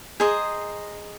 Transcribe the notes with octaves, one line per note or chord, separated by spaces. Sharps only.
G#4 C5 D#5 A#5